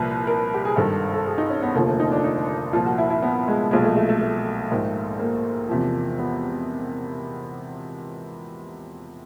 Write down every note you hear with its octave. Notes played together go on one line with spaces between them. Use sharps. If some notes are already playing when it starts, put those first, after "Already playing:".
Already playing: C2 A#2 F3 B4
A#4
G4
G#4
G#1 G2 D#3 A4
A4
G#4
D#4
C#4
B3
F1 D#2 D3 F3 A#3
A3
D#4
D4
D#4
C2 A#2 F3 F4
F#4
E4
E4
B3
G#3
B1 A#2 F3 G#3
A3
A3
A3
A3
A#1 G#2 D#3
A#3
E2 C3 F3
B3